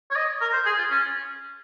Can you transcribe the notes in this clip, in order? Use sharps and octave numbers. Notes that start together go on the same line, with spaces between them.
C#5
D#5
A#4
C5
G#4
F4
C#4